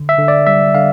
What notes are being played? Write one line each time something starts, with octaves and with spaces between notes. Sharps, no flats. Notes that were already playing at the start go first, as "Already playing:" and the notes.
Already playing: D3
E5
D3
D5
G3 E5
D3 F5